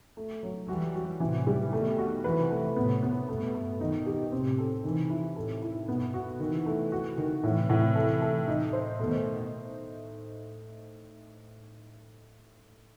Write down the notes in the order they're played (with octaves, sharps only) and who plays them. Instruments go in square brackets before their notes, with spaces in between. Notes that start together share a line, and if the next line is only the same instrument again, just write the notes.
[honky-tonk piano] A3
F#3
[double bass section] E3 G3 [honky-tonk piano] F#4
[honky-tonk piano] F#4
[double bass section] A2 C3 [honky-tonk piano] E3
[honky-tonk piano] G3
[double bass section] B2 D#3 [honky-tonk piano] A3
[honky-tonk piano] F#4
[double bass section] C3 E3 [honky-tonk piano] B4
[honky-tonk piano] A3
[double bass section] A2 C3 [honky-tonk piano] B3
[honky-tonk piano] B3
[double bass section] G2 B2 [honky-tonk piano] A3
[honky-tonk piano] A3
[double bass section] B2 D#3 [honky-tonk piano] D#4
[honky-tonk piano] G4
[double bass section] A2 C3 [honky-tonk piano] C4
[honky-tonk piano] A4
[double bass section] C3 E3 [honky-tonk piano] D#3
[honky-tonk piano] E4
[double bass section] A2 C3 [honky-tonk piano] A4
[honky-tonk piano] E4
[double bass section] G2 B2 [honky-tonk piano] B3
[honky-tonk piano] F#4
[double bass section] C3 E3 [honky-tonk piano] D#3
[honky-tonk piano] A3
F#4
D#3
[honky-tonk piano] A2 [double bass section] C3 E3
[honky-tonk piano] A2
A4
A4
D#4
C5
[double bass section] B2 D#3 [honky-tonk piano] A3